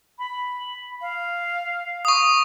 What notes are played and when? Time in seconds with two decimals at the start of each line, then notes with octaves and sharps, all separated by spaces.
0.19 B5
1.01 F5
2.05 C#6 D#6